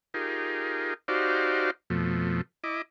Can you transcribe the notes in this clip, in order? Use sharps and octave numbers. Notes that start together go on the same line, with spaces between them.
D#4 F4 G4 G#4 A#4
D#4 F#4 G4 C5 D5 F5
F2 B2 F3 A3
E4 D#5 D6